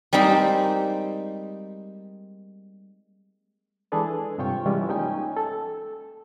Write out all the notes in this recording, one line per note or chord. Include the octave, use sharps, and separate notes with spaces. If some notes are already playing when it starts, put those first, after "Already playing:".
G3 G#3 A#3 C4 D#4 G4
E3 G#3 D4 G#4 A4 B4
G2 C3 F4 C#5 G5 C#6
E3 G3 G#3 C#4 E4 F4
A#3 C#4 D#4 G5 G#5
A4